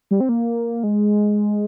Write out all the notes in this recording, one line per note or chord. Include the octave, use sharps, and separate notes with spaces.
G3
C4
A#3
G#3